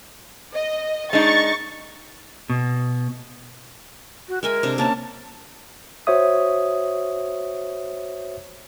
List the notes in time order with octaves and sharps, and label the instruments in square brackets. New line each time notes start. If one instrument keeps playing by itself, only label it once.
[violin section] D#5
[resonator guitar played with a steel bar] G#3 D4 D#4 [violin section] C#6 A6
[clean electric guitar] B2
[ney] F#4
[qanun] G#3 E5 G#5 [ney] A#4
[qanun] C3 D4
[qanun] A#3 C#4 [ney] A5
[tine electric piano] F#4 C5 C#5 E5 D#6